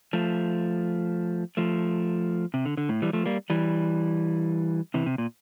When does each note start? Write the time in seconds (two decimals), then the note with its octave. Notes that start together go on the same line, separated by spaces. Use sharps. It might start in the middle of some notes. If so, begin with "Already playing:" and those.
0.13 F3 A3
1.57 F3 A3
2.54 C3
2.66 D3
2.77 D3
2.89 A2
3.02 E3 G3
3.13 F3 A3
3.26 G3 A#3
3.50 E3 G3
4.94 C3 E3
5.06 C3
5.18 A#2